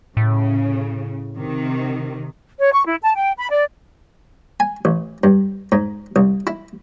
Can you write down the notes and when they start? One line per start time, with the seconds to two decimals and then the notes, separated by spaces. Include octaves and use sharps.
0.17 A2 C#3
1.38 C3 D#3
2.59 C#5
2.72 C#6
2.85 E4
3.03 A5
3.15 G5
3.37 B5
3.50 D5
4.60 G#5
4.85 A1
5.24 G2
5.72 G#2
6.16 C2
6.47 E4